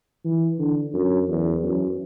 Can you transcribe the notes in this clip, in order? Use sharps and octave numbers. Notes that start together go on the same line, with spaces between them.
E3
D3
F#2
E2
F#2